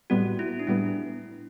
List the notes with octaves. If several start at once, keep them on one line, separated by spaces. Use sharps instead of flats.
A2 G3 B3 F#4
E4
D4
A2 G3 B3 E4